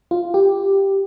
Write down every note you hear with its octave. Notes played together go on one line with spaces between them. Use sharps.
F4
G4